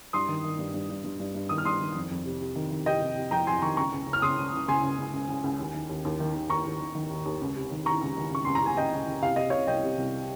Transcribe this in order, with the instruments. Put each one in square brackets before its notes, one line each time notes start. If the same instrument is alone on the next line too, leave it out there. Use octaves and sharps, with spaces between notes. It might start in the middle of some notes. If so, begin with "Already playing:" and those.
[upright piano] G2 C6 D#6
D#3
D#3
G2
G2
G2
G2
G2
G2
D#3 D#6
F6
G2 C6 D#6
D#3
F2
F2
C3
C3
D#3
D#3
C3 D#5 G5
C3
C3
F2 G5 A#5
F2 G#5 C6
D#3 A#5 C#6
C#2 A#5 C#6
C#2
C#3
F6
C#3 C6 D#6
C#2
C#2
C#3 G#5 C6
C#2
C#2
C#2
C#2
C#2
D#2
D#3
D#2
D#2
D#3
D#2
D#2 A#5 C#6
D#2
D#3
D#3
D#2
D#2
C#2
C3
D#3
D#3 A#5 C#6
C#2
D#3
C#2 C#6
C#2 C6
A#5
C3 G#5
C#2 D#5 G5
C#2
C#2
C3 F5
C3 D#5
C3 C#5 F5
C2 D#5 G5
C3
C2